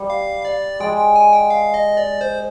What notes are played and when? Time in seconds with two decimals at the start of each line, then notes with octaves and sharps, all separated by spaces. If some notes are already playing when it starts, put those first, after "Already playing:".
Already playing: G3
0.10 F5
0.45 D5
0.80 G#3 G5
0.98 G5
1.16 G#5
1.33 G5
1.50 F5
1.74 D#5
1.97 D5
2.21 C5